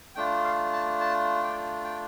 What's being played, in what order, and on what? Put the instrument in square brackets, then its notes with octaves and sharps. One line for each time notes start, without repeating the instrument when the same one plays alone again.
[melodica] A3 D4 F4 G5
F5
A5
A5
G5
G5